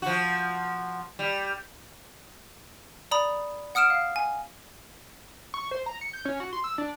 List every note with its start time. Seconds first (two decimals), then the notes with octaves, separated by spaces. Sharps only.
0.02 F3 F#4
1.19 G3
3.11 D5 A#5 B5 D#6 F#7
3.75 F#5 D#6 F6 D7 E7
3.90 F5
4.16 G#5
5.54 C#6
5.71 C5
5.86 A#5
6.01 C#7
6.13 G6
6.25 C#4
6.40 F#4
6.53 C6
6.64 E6
6.78 D4